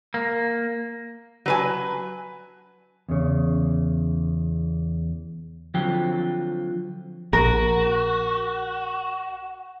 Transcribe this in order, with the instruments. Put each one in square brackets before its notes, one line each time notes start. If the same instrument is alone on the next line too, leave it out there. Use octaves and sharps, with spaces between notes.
[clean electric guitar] A#3
[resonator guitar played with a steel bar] F#3 B4 G#5
[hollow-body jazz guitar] E2 C#3
[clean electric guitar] D3 F3 F#3 C4 F4 G5
[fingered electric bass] A#1 [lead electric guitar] F#4 [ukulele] A#4